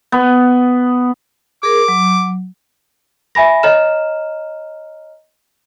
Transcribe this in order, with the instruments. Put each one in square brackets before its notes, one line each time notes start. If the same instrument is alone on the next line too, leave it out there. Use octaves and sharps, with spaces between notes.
[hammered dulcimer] B3
[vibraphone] G#4 A#4 [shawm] D6
[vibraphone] F#3
[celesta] E5 G#5 B5 A#6
C#5 D#5 A#5 F6 E7